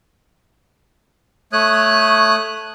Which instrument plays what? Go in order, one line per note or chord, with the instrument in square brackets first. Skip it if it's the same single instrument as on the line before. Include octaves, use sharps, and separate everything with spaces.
[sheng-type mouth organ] A3 C#5 D#6 F#6